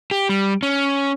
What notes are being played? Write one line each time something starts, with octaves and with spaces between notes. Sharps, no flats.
G4
G3
C#4